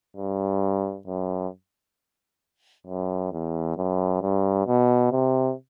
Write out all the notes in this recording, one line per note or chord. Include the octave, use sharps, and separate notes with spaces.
G2
F#2
F#2
E2
F#2
G2
B2
C3